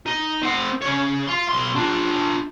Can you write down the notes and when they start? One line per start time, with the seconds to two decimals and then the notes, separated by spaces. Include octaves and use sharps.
0.06 D#4
0.42 C4 F#5
0.82 C#3 C#5
1.28 F5 C6
1.49 B1 C6
1.75 D4 F4